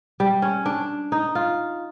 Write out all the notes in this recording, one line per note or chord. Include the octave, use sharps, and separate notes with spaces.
G3
C#4
D4
D#4
F4